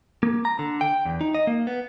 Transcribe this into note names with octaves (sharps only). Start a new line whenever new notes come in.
A#3
A#5
D3
G5
E2
D#4
D#5
A#3
B3